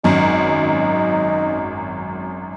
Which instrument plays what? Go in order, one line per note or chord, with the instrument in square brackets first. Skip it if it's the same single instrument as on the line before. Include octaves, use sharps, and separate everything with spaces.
[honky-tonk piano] G#1 F#2 [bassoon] D#4